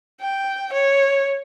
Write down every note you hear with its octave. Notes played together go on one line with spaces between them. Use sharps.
G5
C#5